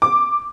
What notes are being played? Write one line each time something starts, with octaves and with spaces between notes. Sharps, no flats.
D6